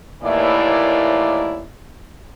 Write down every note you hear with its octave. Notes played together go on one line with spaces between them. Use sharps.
D#2 A2 E3 A#3 E4 D5